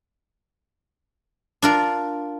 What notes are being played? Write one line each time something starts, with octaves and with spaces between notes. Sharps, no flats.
D4 F4 A#4